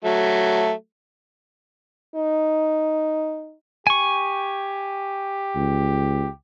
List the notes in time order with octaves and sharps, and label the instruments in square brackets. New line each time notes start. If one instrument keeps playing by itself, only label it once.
[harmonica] F#3 A3
[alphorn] D#4
[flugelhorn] G4 [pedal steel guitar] G#5 C#6
[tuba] C#2